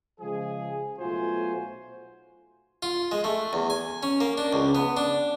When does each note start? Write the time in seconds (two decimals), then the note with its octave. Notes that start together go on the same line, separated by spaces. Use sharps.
0.21 C#3 F3 G#3 G#4
0.98 B1 A3 F4 F#4 C5 G#5
2.83 F4
3.12 G#3
3.24 A3
3.53 E2
3.70 G#5
4.03 C#4
4.20 A#3
4.38 D4
4.53 C#2
4.75 B3
4.97 D4